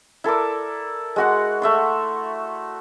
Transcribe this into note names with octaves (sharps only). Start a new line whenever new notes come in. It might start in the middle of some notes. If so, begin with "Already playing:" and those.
E4 A4 A#4 D5
G#3 F#4 F#5
A3 E5 C6